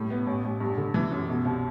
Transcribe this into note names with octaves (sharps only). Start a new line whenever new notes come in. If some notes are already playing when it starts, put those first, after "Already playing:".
Already playing: A2 G3
B3
A1
A1
G2
D3
E3
F#2
B2
C2